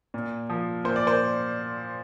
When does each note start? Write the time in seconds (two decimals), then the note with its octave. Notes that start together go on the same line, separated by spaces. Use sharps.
0.14 A#2
0.49 F3
0.84 A#2 C5
0.96 D5
1.07 C5